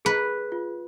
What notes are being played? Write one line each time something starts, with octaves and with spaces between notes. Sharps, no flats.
G#4 B4
F4